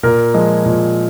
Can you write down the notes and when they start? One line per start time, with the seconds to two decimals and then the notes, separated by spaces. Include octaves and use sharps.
0.03 A#2 A#4
0.34 F3 G#3
0.66 A#2